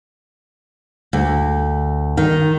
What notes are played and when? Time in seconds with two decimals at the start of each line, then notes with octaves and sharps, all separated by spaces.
1.13 D2
2.17 D#3